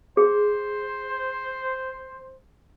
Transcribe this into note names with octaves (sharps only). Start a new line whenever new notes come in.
G#4 C5